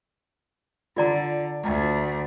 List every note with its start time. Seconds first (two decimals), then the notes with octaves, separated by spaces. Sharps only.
0.97 D3 F4 D5 A#5
1.63 D2